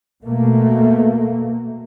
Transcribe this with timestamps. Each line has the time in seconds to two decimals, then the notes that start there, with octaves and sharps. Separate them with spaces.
0.24 B2 A3 A#3